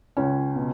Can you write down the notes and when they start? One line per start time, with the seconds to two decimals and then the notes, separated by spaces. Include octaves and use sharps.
0.17 C#2 C#4
0.56 B2